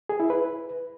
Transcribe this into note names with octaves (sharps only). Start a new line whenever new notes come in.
G#4
E4
B4